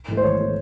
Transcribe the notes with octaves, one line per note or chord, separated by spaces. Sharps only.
G#2 E3 A3
C5
G#1 C#5
E3 A3